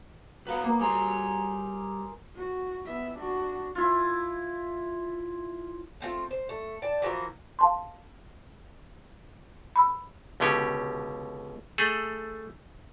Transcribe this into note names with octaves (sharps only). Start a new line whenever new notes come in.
F#3 B3 B4 F5 F#5
A#3 A#4 D6
G3 G#4 C#5 A#5 C6
F#4
B3 E5
D4 F#4
E4 F4
A3 C4 F4
C5
A3
D5 G5 A5
E3 F3 F#4 A#4
F5 A5 C6
B5 E6
C#2 B2 D3 C#4 G4
A3 G#4 A4